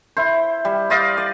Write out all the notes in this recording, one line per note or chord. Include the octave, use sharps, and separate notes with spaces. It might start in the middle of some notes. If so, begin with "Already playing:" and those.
E4 C5
G3
C5 D5 D#5 F5
D5